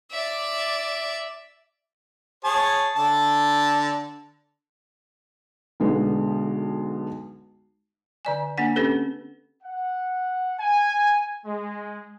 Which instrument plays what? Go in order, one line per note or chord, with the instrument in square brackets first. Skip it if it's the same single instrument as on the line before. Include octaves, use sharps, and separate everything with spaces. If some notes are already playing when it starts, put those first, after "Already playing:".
[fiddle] D5 E5
[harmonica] G#4 C#5 A5
D3 A5
[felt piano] B1 D3 G#3 B3
[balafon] D3 D5 G#5
A#3 D4 F#5
C4 C#4 G4 A4 B4
[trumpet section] F#5
G#5
G#3